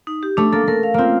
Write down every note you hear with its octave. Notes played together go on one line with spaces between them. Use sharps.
D#4
G4
A3 D4
A#3 A4
A3 A#4
F5
A#3 C4 F4